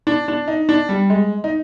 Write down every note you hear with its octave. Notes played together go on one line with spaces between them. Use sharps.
D4
D4
D#4
D4
G3
G#3
D#4